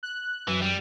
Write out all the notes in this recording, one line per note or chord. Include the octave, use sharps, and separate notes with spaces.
F#6
F#2 E3
G3